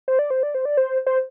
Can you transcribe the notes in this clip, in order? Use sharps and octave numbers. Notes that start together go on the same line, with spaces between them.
C5
D5
C5
D5
C5
D5
C5
C5